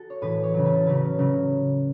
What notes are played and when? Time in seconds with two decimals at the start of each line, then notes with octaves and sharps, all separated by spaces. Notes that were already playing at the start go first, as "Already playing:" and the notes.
Already playing: F#4 A4
0.10 C#5
0.22 A2 E3 B4
0.43 C#5
0.54 C#3 F#3 B4
0.65 B4
0.75 A4
0.86 C#3 F#3 B4
1.19 C#3 F#3